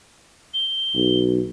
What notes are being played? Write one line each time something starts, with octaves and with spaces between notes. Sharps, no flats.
G7
B1